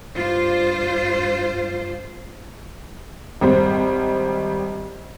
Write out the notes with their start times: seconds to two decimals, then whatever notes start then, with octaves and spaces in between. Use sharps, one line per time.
0.17 G2 F4 C5
3.41 G#1 G3 C5